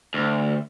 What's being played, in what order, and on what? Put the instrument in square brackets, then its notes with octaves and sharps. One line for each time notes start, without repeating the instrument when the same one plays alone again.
[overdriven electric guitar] D2